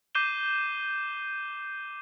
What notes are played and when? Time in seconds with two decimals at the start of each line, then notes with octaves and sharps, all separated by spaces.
0.15 D6 G6 C7 D#7 E7 G7